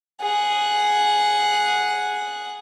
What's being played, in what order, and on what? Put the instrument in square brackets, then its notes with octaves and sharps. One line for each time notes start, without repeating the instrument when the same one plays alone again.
[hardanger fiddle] G#4 F#5